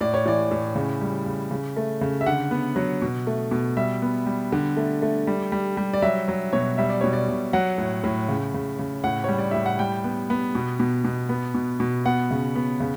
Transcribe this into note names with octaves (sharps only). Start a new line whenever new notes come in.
A2 D5
C#5
E3 D5
A2
C#3
G3
C#3
C#3
A3
C#3
E5
D3 F#5
B3
F#3
B2
A3
B2
G3 E5
B3
G3
D3
A3
A3
G3
G3
G3
D5
F#3 E5
F#3
B2 C#5
G3 E5
D5
B2 C#5
D5
B2
F#3 F#5
A2
A2
C#3
C#3
C#3
A2 F#5
G3 C#5
D5
A2 E5
F#5
G3 G5
B3
B3
B2
B2
B2
B3
B2
B2
B3 F#5
C#3
B3
C#3